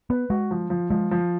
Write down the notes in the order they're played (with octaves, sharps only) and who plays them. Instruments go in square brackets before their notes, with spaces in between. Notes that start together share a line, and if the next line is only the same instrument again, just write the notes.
[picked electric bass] B3 [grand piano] B4
[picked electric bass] G#3 [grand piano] F#4
[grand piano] F3
F3
[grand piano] F3 [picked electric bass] G#3
[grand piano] F3